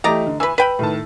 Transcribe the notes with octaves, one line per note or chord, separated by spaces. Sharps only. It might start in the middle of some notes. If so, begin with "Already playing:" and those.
E3 A3 G4 D5 D#5 A#5
D3
E3 B4 G#5 E6
B4 G5 B5 D#7
A2 D#3 A5